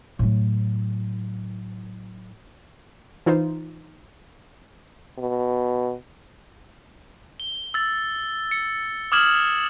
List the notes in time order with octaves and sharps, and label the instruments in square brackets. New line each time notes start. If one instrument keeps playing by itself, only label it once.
[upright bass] A2 F#3
[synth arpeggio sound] E3 D#4 F4 C5
[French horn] B2
[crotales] G7
E6 A6
C#7
D6 D#6 F6 G#6 E7 F#7